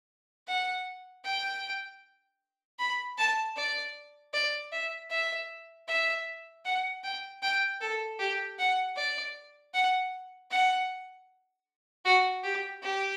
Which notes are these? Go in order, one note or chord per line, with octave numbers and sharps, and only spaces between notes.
F#5
G5
B5
A5
D5
D5
E5
E5
E5
F#5
G5
G5
A4
G4
F#5
D5
F#5
F#5
F#4
G4
G4